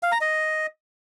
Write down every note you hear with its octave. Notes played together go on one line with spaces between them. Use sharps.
F5
A#5
D#5